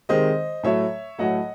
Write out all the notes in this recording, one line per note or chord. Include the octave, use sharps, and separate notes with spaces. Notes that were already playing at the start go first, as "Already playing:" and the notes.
C3 D#3 G#3 C5 D#5
A2 F#3 A3 C#5 E5
A2 F#3 A3 D#5 F#5